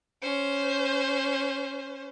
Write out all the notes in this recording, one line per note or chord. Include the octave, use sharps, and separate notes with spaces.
C#4 C5